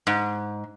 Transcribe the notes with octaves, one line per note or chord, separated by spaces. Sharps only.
G#2